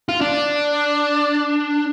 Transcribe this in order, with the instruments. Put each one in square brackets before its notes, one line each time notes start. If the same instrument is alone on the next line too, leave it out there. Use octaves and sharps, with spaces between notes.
[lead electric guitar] F4
D4